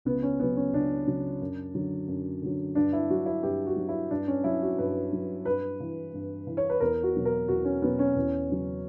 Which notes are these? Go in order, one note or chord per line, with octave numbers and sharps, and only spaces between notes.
C#2 B3
C#4
C#3 F#3 B3
C#4
C#2 D4
C#3 F#3
F#2
D3 F#3
F#2
D3 F#3
G2 D4
E4
F#3 F#4
E4
G2 G4
F#4
F#3
E4
G2 D4
C#4
F#3 E4
F#4
G2 B4
F#3
G2 B4
E3
G2
E3
C#5
B4
E2 A#4
F#4
B2 F#3
A#4
E2 F#4
C#4
B2 F#3 B3
C#4
E2
C#3 F#3